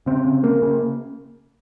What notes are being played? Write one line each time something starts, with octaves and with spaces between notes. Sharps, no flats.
C#3 C4
C#3
C#3 A#3
C#3